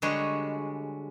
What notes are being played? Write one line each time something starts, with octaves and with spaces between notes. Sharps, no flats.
D3 G3 G#3 F#4 C#5